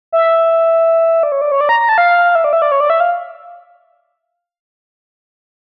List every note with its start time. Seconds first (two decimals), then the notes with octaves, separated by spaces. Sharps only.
0.12 E5
1.23 D5
1.32 C#5
1.41 D5
1.52 C#5
1.61 D5
1.69 A#5
1.80 A#5
1.89 A5
1.98 F5
2.35 E5
2.44 D5
2.53 E5
2.62 D5
2.72 C#5
2.80 D5
2.90 E5
3.00 F5